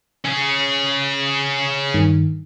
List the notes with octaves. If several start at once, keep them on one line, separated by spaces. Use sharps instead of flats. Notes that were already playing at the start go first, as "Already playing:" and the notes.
C#4 G#4
G2 D#3